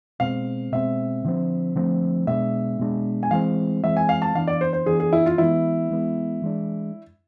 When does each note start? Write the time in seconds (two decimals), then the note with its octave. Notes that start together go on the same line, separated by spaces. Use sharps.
0.20 B2 G#3 C4 F5
0.72 B2 G#3 C4 E5
1.25 D3 F3 A3 C4
1.76 D3 F3 A3 C4
2.27 B2 G#3 D4 E5
2.79 B2 G#3 D4
3.23 G#5
3.31 E3 G#3 C4 F5
3.83 E3 G#3 C4 E5
3.97 G#5
4.09 F5
4.22 A5
4.35 E3 B3 D4 F5
4.48 D5
4.61 C5
4.73 C5
4.86 E3 B3 D4 G#4
5.00 G#4
5.13 E4
5.26 F4
5.38 E3 G#3 B3 E4
5.90 E3 G#3 B3
6.42 E3 G#3 D4